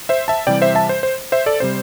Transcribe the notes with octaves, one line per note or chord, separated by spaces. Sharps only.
C5 E5
E5 A5
C3 E3 G3 D5 G5
C5 E5
E5 A5
C5
C5
C5 E5
A4 D5
C3 G3 C5